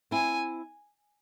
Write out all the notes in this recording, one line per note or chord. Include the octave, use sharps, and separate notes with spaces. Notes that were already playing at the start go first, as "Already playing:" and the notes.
C4 E4 G#5